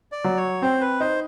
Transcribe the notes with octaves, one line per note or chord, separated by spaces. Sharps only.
D5
F#3
C#5
C4 C5
B4
D#4 C5